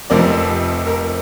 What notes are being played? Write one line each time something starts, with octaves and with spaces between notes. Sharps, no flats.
F1 F2 C3 F3 A#4 D5
A#4